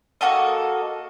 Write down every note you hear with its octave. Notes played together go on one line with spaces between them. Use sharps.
A#3 F#4 A4 D#5